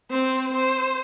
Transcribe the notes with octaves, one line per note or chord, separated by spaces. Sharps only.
C4 C5
C5